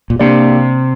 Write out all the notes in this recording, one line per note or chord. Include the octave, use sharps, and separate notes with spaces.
A#2
C3 A#3 D4 G4 D5 G5